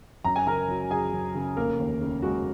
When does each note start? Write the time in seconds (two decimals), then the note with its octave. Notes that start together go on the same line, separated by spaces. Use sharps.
0.24 F#2 A#5
0.36 G#5
0.47 C#3 A#4 A#5
0.68 F#3
0.90 F#2 G#4 G#5
1.12 F#2
1.35 C#3
1.57 F1 A#3 A#4
1.79 D#2
2.01 C#3
2.22 G#3 F#4